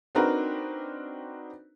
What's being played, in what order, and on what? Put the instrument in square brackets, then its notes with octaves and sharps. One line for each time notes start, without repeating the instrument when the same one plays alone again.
[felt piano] C4 D4 D#4 F#4 A#4 B4